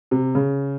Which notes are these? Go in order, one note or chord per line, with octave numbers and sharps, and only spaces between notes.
C3
C#3